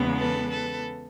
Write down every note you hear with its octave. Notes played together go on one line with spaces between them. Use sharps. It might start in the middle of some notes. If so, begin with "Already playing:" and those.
Already playing: E2 C#3 E3 G#3 B3
A4 B4
A4 B4